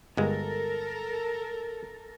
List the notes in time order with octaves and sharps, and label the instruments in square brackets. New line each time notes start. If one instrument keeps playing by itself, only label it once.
[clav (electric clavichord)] G1 G#3 [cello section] A4 A#4